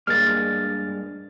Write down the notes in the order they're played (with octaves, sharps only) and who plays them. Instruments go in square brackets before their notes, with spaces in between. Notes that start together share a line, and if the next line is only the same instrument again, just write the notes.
[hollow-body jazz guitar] G2 G#3 A#3 [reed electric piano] F6 A6